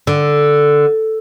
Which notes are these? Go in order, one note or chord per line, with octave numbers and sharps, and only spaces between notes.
D3